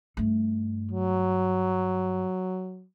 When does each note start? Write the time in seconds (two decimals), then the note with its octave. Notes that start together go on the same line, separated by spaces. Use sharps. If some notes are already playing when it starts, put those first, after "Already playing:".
0.17 G2 A3
0.91 F#3